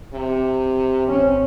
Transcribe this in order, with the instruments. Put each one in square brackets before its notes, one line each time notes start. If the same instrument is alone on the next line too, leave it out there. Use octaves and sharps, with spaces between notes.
[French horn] C3
[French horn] C4 [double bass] C#4